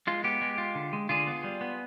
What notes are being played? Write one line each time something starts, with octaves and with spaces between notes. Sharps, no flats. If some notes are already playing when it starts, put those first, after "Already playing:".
G#3 F4
B3 G4
G#3
F4
D3
G#3
D3 F4 G#4
B3
G3
B3